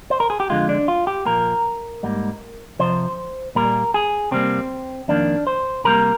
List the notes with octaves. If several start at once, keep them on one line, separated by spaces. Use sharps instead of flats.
C5
A#4
G#4
G4
F2 D3 G#3 F4
D4
F4
G4
A#2 F3 A#3 A#4
G#2 G3 A#3
F2 C3 F3 C5
A#2 G3 A#3 A#4
G#4
C3 G3 A#3 C4
F2 D#3 A#3 D4
C5
C3 G3 A#3 A#4